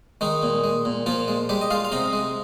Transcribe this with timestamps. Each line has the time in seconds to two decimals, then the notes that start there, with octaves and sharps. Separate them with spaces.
0.21 D#3 G#3 D#4
0.43 A#2
0.64 G#3
0.85 A#2
1.06 A#2 F3 F4
1.28 G#3
1.49 G3 G#3 G4
1.61 D#5
1.70 G#3 F4 F5
1.85 F5
1.92 C3 D#4 D#5
2.13 G#3